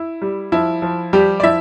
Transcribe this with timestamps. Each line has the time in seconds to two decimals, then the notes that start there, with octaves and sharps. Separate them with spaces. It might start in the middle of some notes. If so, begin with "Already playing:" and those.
Already playing: E4
0.22 G3
0.52 F3 E4
0.82 F3
1.13 F3 G3 G4
1.40 D5
1.43 F3 E4 E5